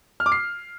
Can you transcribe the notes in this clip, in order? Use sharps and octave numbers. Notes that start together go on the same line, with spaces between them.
F6
D6
C7